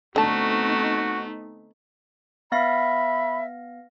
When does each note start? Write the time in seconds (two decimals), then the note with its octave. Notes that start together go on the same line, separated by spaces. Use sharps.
0.16 D3 A3 B3 C4 D#4 F#4 A5
2.52 B3 E5 F5 B5 A#6